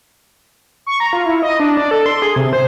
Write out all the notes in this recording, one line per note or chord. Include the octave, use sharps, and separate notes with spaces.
C#6
A#5
F4
E4
D#5
D4
D5
A4
C6
G#4
C3
C5